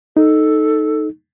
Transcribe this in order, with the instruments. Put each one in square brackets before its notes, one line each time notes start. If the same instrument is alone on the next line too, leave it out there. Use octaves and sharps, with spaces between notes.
[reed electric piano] D#4 [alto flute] A4